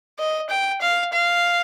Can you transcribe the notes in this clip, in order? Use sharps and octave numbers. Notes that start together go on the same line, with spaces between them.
D#5
G5
F5
F5